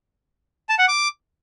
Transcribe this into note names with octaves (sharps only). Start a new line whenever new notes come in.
A5
F#5
D6